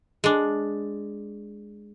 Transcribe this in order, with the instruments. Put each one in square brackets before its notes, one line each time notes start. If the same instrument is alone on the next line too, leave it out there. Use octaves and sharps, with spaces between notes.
[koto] G#3 D4